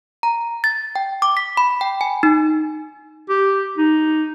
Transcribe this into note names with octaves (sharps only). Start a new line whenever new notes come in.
A#5
A6
G5
D6
B6
B5
G5
G#5
D#4
G4
D#4